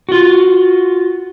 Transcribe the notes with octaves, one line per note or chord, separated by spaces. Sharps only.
F4 F#4